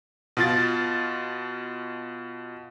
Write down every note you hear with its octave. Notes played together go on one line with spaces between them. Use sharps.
B2 F4 A6